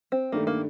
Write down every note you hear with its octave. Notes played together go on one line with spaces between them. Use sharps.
C4
G2 D#3 A3 A#3 D4
A#3